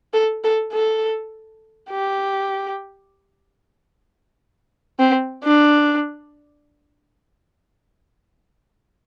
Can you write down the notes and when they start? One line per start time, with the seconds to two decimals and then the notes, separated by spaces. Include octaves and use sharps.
0.13 A4
0.44 A4
0.72 A4
1.90 G4
4.99 C4
5.43 D4